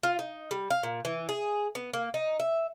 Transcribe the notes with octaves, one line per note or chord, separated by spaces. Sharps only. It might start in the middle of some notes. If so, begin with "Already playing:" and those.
F4
D#4
G3
F5
A#2
E3
G#4
B3
A#3
D#4
E5